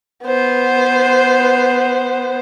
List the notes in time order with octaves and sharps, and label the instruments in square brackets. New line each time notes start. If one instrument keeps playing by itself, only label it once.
[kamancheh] B3 C5